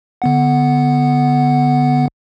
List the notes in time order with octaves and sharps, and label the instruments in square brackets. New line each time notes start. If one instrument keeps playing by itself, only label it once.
[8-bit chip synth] D3 B3 F#5